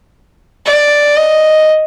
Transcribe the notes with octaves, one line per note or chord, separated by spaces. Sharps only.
D5
D#5